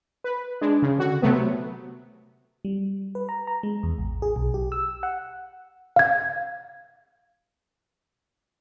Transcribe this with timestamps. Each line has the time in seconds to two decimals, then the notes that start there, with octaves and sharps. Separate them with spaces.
0.24 B4
0.61 G#3 D4
0.82 C#3
0.99 D3 F#4
1.22 C3 F#3 A3 B3
2.65 G3
3.15 B4
3.29 A#5
3.47 A#5
3.63 G#3
3.83 E2
3.98 A1
4.22 G#4
4.36 B1
4.54 G4
4.72 E6
5.03 F#5
5.96 F5 G#6